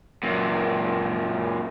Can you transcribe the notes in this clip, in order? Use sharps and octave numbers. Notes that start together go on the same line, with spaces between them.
F#2 A#2